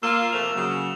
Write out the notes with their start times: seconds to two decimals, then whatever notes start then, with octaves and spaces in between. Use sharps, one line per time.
0.03 A#3 F4 E6 E7
0.33 C3 F3 A3 F7
0.55 C#3 F#3